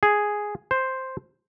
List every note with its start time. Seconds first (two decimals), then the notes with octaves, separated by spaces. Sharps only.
0.03 G#4
0.71 C5